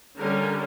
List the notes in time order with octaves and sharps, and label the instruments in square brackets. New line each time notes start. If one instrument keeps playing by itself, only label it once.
[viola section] D3 G3 C#4 A#4